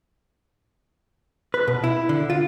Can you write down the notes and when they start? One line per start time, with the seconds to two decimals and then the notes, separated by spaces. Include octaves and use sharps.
1.54 B4
1.67 B2
1.84 E4
2.09 D3
2.30 F4